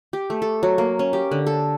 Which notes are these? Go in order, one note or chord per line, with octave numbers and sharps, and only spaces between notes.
G4
A3
A4
F#3
A#3
C#4
G4
D3
A4